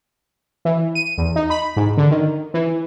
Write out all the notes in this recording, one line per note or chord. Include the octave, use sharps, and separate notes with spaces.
E3
D#7
E2
D#4
B5
G#2
D3
D#3
E3